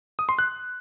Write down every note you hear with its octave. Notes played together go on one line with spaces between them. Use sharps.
D#6
C6
F#6